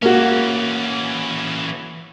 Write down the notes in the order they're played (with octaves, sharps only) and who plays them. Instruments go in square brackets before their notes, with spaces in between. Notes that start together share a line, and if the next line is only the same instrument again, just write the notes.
[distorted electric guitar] E3 C#4 [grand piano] A#3 F#4